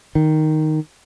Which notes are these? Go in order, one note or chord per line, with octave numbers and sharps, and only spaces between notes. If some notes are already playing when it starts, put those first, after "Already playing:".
D#3